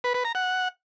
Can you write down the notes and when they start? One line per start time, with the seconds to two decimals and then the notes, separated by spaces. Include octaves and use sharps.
0.04 B4
0.14 B4
0.25 A#5
0.35 F#5